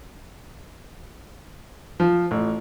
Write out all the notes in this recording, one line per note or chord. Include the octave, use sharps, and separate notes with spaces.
F3
A1